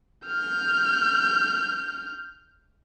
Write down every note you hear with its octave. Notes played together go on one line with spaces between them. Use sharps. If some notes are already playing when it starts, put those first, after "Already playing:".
F6 G6